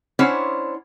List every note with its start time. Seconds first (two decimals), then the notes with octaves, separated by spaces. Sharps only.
0.19 C#4 D4 E4 C5 C#5 F#5